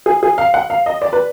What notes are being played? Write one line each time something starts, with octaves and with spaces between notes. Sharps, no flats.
G#4
G#4
F5
F#5
F5
D#5
D5
B4